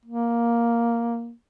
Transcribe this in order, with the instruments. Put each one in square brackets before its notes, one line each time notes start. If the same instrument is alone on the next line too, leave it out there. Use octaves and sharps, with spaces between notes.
[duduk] A#3